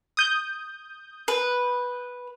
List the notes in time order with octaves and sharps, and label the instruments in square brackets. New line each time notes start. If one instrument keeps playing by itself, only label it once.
[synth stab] D#6 G6
[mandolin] B4